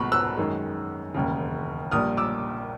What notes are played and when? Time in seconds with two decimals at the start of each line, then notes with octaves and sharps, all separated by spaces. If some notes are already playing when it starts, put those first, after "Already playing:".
Already playing: B1 B2 G#3 B5 C#6
0.12 E6 F#6
0.37 F#2 D#3 G#3
1.14 E1 D#2 C#3
1.91 A#1 A#2 G3 D#6 F6
2.17 D6 E6